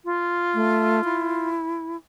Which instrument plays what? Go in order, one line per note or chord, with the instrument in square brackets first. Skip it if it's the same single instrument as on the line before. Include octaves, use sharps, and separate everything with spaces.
[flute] F4
[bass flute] A3
E4